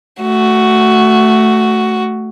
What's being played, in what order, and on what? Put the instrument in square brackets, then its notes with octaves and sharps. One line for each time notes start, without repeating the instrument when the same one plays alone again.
[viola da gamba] A3 [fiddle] F#4